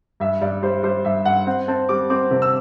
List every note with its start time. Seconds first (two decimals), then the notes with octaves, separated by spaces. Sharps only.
0.20 G2 E5
0.41 G2 D5
0.63 G3 C5
0.83 G3 C5
1.05 G2 E5
1.25 G2 F#5
1.47 C4 F#5
1.68 C4 A5
1.89 G3 D6
2.10 C4 D6
2.31 C3
2.42 E6